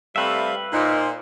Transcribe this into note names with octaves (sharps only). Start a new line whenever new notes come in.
C3 G3 A3 B4 E5 F5
A#2 D#4 C5